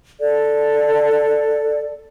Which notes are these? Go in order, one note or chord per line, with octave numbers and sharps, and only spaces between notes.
A4 D5